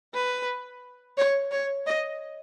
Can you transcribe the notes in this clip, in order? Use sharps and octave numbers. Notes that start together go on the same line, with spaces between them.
B4
C#5
C#5
D#5